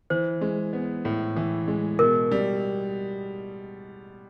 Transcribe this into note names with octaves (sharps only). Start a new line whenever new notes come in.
E3 C5
G#3
B3
A2
E3
G#3
B2 A#4
G3